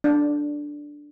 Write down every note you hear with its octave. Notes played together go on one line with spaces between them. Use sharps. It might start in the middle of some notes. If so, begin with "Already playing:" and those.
D4